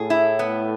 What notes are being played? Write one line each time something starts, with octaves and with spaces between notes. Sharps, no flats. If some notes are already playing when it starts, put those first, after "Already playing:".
Already playing: A2 G#4
E4
B3